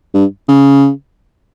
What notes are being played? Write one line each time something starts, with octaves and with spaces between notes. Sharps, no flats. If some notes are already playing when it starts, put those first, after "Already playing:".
G2
C#3